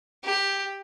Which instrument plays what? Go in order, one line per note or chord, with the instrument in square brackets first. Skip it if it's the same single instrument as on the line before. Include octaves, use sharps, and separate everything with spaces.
[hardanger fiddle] G4